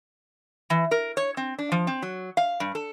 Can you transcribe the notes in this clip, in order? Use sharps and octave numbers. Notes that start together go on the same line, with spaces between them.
E3
A#4
C#5
C4
D4
F3
C4
F#3
F5
G2
A4